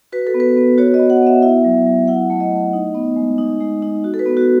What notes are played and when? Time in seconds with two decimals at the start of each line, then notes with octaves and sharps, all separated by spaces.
0.12 F#4 B4
0.27 A4
0.34 B3
0.40 B4
0.56 B3
0.78 F#4 C#5
0.94 D#5
0.99 B3
1.10 F#5
1.22 B3 E5
1.42 E4 E5
1.64 F#3
1.86 F#3
2.08 E4 F#5
2.30 A3
2.40 D#5
2.52 A3
2.73 D#4
2.94 B3
3.16 G#3
3.38 D#4
3.61 G#3
3.82 D#4
4.04 F#4
4.14 A4
4.19 B4
4.26 B3
4.37 F#4